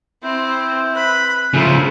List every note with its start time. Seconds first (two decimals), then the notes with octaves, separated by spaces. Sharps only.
0.23 C4 E4 C5
0.96 B4 B5
1.54 C#3 F3 E4 A4 C5